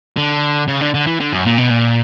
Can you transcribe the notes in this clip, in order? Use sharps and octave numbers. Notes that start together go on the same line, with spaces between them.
D3
C#3
D3
D3
E3
D3
F#2
A#2
B2
A#2